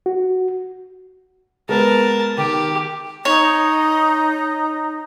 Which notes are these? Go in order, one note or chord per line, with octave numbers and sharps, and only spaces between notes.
F#4
G#3 B3 A#4 B4 A5
D#3 G4
D#4 C#5